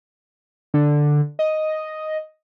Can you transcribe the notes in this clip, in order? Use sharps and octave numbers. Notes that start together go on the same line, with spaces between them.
D3
D#5